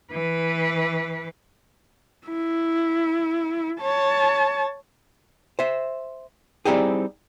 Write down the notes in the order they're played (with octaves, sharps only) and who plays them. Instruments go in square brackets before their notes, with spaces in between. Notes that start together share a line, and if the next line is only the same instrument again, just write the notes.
[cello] E3 B4
[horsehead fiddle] E4
C#5 A5
[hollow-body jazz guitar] C5 E5
G3 C4 D#4 E4 G4 G#4